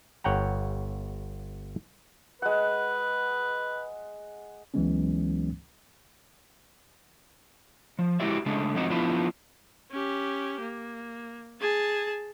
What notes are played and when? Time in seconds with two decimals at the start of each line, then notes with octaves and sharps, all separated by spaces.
0.24 G1 C#5 F#5 G5 A#5
2.42 G#3 B4 F#5
4.74 C#2 E3 F#3 G#3 B3 C#4
7.99 F3
8.20 G#3 E4 F#4 G4 D5 E5
8.46 C#3 G#3 A3 D4
8.75 F3 G#3 C4 D#4 F#4
8.90 F3 B3 D4 E4 F4
9.91 C#4 G4
10.61 A#3
11.61 G#4 A5